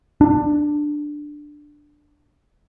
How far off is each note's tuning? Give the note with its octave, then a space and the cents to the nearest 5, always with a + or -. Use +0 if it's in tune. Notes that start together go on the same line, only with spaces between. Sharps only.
D4 +10